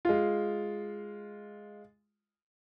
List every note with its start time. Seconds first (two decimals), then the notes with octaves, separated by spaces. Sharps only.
0.05 G#3 F4